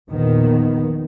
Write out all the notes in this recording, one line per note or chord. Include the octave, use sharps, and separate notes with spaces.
A#1 E2 A#2 D#3 B3